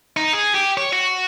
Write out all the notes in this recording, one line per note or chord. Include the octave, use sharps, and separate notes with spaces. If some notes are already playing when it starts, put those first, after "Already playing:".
D#4
G#4
G4
C#5
F#4